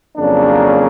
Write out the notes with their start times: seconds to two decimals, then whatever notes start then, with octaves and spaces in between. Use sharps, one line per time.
0.17 F2 C#3 F#3 A#3 D4